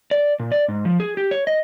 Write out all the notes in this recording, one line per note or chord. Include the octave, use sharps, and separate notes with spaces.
D5
A#2
D5
G#2
F3
G#4
G4
C#5
D#5